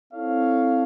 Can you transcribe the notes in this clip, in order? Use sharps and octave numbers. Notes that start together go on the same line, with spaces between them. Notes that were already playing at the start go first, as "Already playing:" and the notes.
C4 E4 A4 C#5 F5